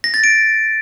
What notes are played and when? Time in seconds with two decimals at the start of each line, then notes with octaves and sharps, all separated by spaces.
0.04 A#6
0.14 A6
0.24 D7